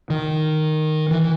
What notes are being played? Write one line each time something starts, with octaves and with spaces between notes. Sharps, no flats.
D#3
E3